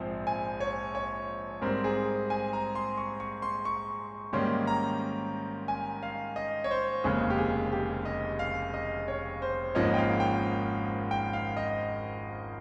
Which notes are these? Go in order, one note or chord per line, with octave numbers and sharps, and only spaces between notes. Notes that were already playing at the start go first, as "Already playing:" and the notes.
Already playing: A#1 G#2 F3 C4 C5
G#5
C#5
C#5
G#2 G3 C4 A#4
G#4
G#5
A#5
C6
C#6
C#6
C6
C#6
G#2 D#3 G3 A#3 C#4 C6
A#5
G#5
F5
D#5
C#5
C5
F1 D#2 C#3 G#3 G#4
G4
G#4
G4
D#5
F5
D#5
C#5
C5
G#1 G#2 F3 A#3 C#4 D#5
G5
F5
G5
G5
F5
D#5